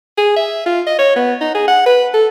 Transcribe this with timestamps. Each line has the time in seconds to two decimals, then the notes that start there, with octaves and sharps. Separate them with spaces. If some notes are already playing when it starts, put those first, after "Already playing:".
0.18 G#4
0.36 E5
0.66 F4
0.87 D#5
0.99 C#5
1.16 B3
1.41 D#4
1.55 G#4
1.68 F#5
1.86 B4
2.14 A4